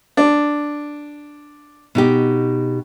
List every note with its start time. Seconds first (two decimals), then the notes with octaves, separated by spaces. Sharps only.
0.17 D4
1.95 B2 D#4 G4